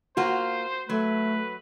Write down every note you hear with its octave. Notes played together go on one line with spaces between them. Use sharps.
A#3 F4 F#4 C5
F#3 A3 B4